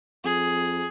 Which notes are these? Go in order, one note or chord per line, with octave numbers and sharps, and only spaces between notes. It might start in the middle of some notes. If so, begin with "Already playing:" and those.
F2 G#4